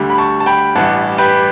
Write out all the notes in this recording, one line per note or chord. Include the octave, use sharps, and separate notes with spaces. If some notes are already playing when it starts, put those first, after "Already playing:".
Already playing: D2 D3 G3
B5
A5 C#6
A5
G5 B5
A1 G2 E3 F#5 A5
G4 B4